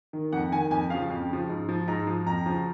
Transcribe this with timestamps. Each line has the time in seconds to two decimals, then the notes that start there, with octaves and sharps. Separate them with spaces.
0.13 D#3
0.32 F2 F#5
0.52 D#3 G#5
0.71 F2 G#5
0.90 C#3 F3 F5
1.10 F2
1.29 C#3 F3
1.49 G#2
1.69 F3
1.88 G#2 A#5
2.07 F3
2.26 F2 A#5
2.46 C#3 F3